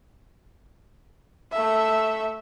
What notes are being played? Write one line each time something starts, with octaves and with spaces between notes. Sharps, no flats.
A3 E5